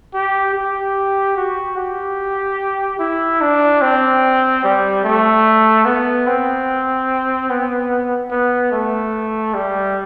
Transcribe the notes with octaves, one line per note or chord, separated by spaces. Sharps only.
G4
G4
F#4
G4
E4
D4
C4
G3
A3
B3
C4
B3
B3
A3
G3